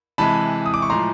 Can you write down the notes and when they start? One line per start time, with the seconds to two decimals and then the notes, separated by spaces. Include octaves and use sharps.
0.18 C3 E3 G#3 A5 B5
0.66 D#6
0.74 D6
0.82 C#6
0.89 A2 F3 G#3 A#5 C6